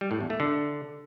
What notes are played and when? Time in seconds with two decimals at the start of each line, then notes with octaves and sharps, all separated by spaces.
0.01 G3
0.11 A2
0.20 E2
0.30 A3
0.40 D3